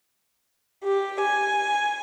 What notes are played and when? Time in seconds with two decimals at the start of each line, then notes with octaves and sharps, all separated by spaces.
0.84 G4
1.22 G#5